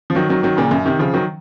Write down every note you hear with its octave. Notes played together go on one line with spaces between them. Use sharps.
F3
D#3 F#3
D#3 F#3
D#3 F#3
A#2 C#3
F#2
C3 D#3
C#3 F3
D#3 F#3